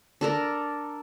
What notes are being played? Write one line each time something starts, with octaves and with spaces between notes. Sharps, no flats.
D4 A4 A#4